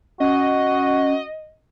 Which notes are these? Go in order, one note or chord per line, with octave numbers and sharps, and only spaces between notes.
C#4 F#4 D#5